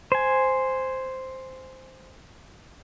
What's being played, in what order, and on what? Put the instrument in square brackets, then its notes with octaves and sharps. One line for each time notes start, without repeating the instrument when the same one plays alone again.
[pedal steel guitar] C5 G#5